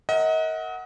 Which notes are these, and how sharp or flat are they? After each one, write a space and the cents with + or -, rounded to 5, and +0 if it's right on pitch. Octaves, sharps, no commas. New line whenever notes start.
A#4 -10 D#5 +35 F#5 +0